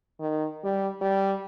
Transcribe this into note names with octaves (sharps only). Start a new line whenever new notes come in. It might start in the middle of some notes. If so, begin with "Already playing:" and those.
D#3
G3
G3